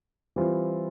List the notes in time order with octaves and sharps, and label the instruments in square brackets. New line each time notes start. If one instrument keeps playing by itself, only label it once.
[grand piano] E3 G3 C4 F4